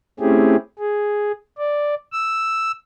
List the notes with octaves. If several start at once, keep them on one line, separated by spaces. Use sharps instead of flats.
A3 C4 C#4 E4 G4 G#4
G#4
D5
E6